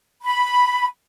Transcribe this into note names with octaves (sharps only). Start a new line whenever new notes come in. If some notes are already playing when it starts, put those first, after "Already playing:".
B5